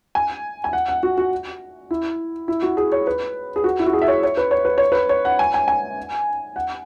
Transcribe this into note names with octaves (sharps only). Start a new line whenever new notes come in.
G#5
G#5
F#5
F#5
F#4
F#4
E4
E4
F#4
G#4
C#5
B4
G#4
F#4
E4
F#4
G#4
E5
C#5
C#5
B4
C#5
B4
C#5
B4
C#5
F#5
G#5
G#5
G#5
F#5